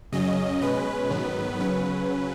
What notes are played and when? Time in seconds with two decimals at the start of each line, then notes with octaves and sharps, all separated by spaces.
0.12 F#2 C#3 F#3 C#4 D#5
0.61 B2 G#3 C#4 B4
1.10 G#2 D#3 F#3 B3
1.60 C#3 F#3 C#4 B4